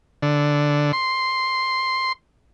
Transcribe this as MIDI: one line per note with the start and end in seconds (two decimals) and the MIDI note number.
0.22 0.92 50
0.93 2.12 84